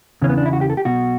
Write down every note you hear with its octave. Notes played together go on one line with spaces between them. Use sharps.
E2 C#3 E3 C#4
B3
D4
E4
F#4
G4
A4
G4
B1 B2 F#4